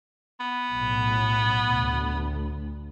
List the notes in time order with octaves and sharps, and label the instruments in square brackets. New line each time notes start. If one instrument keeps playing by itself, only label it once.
[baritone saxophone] B3
[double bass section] B1 A2
D2